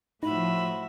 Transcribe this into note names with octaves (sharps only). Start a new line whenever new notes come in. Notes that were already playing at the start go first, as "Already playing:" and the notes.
A2 F3 D#4 F#4 E5 B5